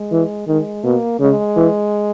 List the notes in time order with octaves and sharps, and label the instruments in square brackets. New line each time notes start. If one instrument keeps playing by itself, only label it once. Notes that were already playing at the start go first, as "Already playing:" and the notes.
Already playing: [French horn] G#3
[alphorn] E3
[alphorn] D#3 [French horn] G#3
[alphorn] B2 [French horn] A#3
[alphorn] C#3 [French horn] G#3
[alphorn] E3